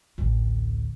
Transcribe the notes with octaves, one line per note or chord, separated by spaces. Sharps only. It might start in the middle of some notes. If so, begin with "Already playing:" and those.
A1 D2